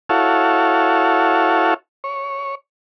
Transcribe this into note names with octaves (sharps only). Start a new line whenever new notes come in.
E4 F#4 A4 C#5 F5
C#5